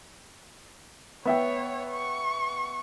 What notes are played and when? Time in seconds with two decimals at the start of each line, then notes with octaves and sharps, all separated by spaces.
1.25 B3 C#5 E5 G5
1.91 C#6